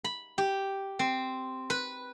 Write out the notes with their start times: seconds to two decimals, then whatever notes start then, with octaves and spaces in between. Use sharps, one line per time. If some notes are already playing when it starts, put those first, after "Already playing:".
0.04 B5
0.38 G4
0.99 C4
1.70 B4